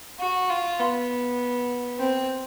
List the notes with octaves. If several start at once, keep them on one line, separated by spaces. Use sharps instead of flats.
F#4
F4
B3
C4